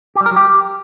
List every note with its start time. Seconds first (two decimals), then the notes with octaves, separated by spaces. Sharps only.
0.15 G4
0.21 G3
0.26 A#4
0.31 F#3
0.36 G4